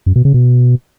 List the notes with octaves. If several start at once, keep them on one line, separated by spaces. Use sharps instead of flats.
F#2
B2
C#3
B2